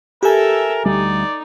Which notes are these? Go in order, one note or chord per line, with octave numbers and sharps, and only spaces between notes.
G4 A4 A#4 E5 G#5
D2 G3 D#4 D5